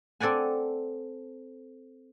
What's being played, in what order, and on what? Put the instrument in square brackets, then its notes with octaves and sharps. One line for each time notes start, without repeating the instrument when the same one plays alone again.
[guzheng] C4 A4 D5 F#5 G#5